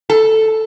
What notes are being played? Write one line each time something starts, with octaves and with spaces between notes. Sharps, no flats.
A4